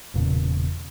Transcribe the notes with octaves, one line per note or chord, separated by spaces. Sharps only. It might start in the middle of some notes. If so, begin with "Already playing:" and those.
E1 E2 A#2 C#3